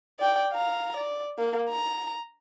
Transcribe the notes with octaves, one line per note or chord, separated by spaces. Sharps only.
D5 G5
F5 A#5
D5
A#3
A#5